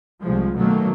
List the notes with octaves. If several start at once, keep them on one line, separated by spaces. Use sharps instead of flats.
C2 F3 G#3
B2 D#3 F#3 A3 A#3